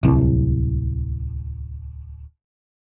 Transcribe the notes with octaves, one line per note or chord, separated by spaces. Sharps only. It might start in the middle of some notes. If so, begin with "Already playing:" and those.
D1 C2